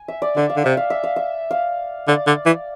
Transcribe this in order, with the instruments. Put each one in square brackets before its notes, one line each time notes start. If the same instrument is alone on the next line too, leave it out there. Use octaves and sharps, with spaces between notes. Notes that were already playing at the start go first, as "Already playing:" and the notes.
Already playing: [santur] G#5
E5
D5
[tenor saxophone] D3 [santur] E5
[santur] F5
[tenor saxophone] D3
[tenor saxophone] C3 [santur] E5
[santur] F5
E5
F5
E5
F5
[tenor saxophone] D3 [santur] D5
[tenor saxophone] D3
E3